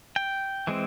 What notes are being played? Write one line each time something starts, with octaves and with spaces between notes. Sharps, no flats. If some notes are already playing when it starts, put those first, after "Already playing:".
G5
E3 G#3 C4